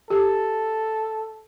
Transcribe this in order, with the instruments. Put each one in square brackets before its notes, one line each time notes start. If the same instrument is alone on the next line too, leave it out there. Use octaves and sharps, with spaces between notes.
[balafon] G4 [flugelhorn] A4